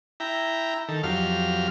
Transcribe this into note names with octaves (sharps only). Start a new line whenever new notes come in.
E4 G5 A#5
D#3 A4
F2 F#3 G4 F5 F6